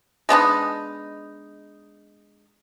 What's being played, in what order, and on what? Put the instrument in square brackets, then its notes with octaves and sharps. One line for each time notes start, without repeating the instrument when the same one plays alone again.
[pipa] G#3 B3 D4 D#4